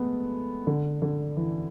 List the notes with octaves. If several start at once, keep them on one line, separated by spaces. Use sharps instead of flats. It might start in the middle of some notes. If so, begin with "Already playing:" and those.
Already playing: G#3 A3 B3
D3
D3
E3